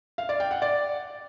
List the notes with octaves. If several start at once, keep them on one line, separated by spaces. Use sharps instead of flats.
F5
D5
G5
F#5
D5